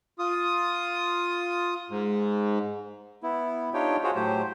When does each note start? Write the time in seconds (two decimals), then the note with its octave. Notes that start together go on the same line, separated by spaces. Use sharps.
0.19 F4 D#6
1.90 G#2
3.23 B3 E4
3.74 D4 D#4 F4 G4 C#5 G5
4.03 F4 F#4 G#4 C5 C#5
4.16 A2 F#3 A3 G4 C5